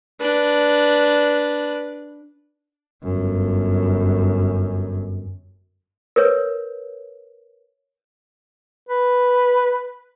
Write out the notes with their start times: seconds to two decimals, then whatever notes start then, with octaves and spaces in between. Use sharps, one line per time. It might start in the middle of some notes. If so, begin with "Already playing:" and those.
0.20 D4 B4
3.04 G1 F#2
6.16 A#4 B4 C#5
8.89 B4